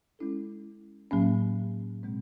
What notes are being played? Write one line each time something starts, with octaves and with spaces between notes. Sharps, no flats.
G#3 C#4 E4 A4
A2 F#3 A#3 C#4
B2 G#3 C4